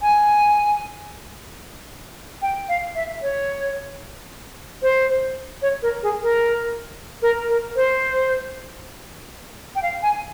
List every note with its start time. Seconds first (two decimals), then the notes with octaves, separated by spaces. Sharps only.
0.02 G#5
2.42 G5
2.69 F5
2.95 E5
3.22 C#5
4.82 C5
5.62 C#5
5.82 A#4
6.03 G#4
6.23 A#4
7.22 A#4
7.49 A#4
7.76 C5
9.75 G5
9.82 F5
10.03 G#5